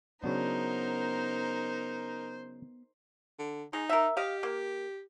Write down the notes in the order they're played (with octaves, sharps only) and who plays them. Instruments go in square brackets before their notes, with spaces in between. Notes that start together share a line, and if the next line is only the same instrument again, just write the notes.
[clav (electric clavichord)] C#3 F#3 D4 [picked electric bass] B3 [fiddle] D#4 A#4 [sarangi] C5
[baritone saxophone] D3
[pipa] G#3 [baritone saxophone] D#4
[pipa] A#4 E5
[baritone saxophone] G4 [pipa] D#5 F5
[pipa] A#3